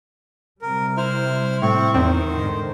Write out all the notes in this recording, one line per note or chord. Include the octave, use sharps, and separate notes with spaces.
C3 G3 A#4
E4 C5 F6
A2 C4 C#6
E2 D#3 C4 C5
G#2 D3